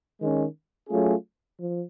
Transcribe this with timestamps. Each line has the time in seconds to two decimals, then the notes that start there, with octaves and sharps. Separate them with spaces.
0.20 D#3 G#3 C#4
0.89 F#3 A3 C#4 F4 G#4
1.59 F3